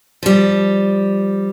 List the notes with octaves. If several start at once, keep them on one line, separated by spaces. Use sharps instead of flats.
F3 G3